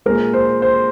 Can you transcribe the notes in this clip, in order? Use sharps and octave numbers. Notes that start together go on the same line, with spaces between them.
A#2 G#3 A#4
C5
C5